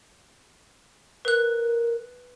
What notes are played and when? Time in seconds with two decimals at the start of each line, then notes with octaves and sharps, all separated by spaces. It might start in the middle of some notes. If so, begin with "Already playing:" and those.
1.25 A#4 B4 F#6